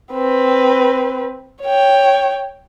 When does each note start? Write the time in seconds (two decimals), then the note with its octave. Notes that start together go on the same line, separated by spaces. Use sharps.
0.13 C4 B4
1.62 C#5 G5